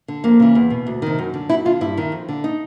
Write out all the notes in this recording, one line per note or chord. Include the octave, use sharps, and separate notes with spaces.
D3
F2 A#3
C#3 E3
E2
B2
D2
C3 D#3
F#2
D3
F#2 E4
D3 F4
G2 E4
D#3
F2
D3
D#4